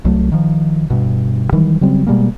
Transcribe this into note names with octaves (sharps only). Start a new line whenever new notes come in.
C2 F#3 A3
D#3 F3
G2 B2
D#3 E3 F#3 G3
C#3 F#3 G3 C4
B2 G3 G#3 A#3